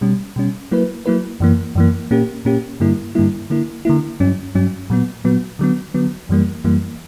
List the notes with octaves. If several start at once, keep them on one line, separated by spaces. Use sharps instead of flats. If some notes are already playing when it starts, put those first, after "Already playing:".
B2 G3 C#4
B2 G3 C#4
F#3 A#3 E4 B4
F#3 A#3 E4 B4
F#2 E3 A#3
F#2 E3 A#3
A#2 A#3 C#4 G4
A#2 A#3 C#4 G4
G2 D3 G3 A#3 E4
G2 D3 G3 A#3 E4
D3 A#3 E4
D3 A#3 E4
G2 F#3 C#4
G2 F#3 C#4
A#2 F#3 B3
A#2 F#3 B3
D3 F#3 B3
D3 F#3 B3
F#2 E3 G3 A#3
F#2 E3 G3 A#3